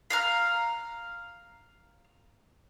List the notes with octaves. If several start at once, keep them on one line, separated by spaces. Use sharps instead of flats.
F5 A#5 F6